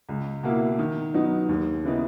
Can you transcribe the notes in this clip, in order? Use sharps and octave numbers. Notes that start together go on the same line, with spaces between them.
C#2
B2 A#3 E4
D#3
F#3 B3 D#4
D#2
C#3 E3 B3 D#4